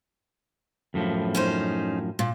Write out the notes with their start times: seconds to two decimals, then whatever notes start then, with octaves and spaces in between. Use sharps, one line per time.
0.94 F#2 A2 F3
1.35 C#4 D#4 C5
2.19 A#2